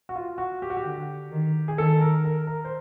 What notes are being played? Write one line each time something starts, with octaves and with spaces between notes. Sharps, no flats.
F#4
F4
F#4
G4
F#4
G4
D3
D#3
G#4
D#3 A4
A#4
A#4
A#4
C5